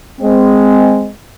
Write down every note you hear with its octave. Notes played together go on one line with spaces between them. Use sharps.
G#3 C4